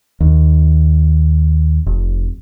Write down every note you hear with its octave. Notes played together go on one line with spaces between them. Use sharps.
D#2
F1